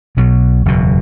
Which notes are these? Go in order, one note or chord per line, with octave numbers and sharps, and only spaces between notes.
B1 B2 F#3
F#1 E2 B2